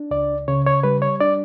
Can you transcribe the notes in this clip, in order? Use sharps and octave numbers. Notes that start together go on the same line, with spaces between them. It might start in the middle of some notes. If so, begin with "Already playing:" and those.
Already playing: D4
C#2 D5
C#3 C#5
C#5
G3 B4
C#5
D4 D5